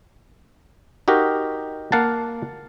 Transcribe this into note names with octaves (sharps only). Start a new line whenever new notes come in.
D#4 F#4 G4 A#4
A#3 F5 F#5 A5